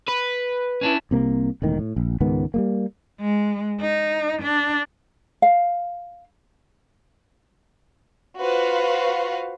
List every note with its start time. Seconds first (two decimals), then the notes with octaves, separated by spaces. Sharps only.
0.09 B4
0.81 C#4 D4 E4
1.11 C2 C3 A#3
1.62 E1 A2 D#3
1.79 A2
1.96 A#1
2.20 C#2 G#2 D#3 B3
2.54 G3 G#3 A#3
3.21 G#3
3.81 D#4
4.43 D4
5.42 F5
8.39 F4 F#4 B4 C5 F5